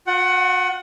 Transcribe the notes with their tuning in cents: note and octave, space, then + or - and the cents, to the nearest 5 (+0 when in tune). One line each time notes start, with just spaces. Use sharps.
F#4 -45 F#5 +15